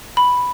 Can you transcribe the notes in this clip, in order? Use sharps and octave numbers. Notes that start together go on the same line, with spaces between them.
B5